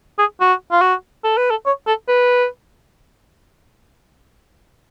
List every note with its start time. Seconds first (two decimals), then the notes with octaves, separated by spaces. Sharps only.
0.19 G#4
0.41 F#4
0.72 F4
0.82 F#4
1.24 A4
1.37 B4
1.50 A4
1.66 C#5
1.87 A4
2.08 B4